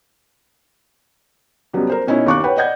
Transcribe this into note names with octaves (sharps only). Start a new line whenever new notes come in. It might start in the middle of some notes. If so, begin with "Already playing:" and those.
C#2 F#3 G3 B3
A#4 C5
B2 C#4 D#4 E4
D#2 F5 C#6 D6 F#6
B4 C#5 F#5 G5
D5 D#5 F#5 G6 G#6